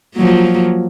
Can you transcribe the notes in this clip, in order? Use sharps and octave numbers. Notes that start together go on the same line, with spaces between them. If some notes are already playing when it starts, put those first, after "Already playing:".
F3 F#3 A#3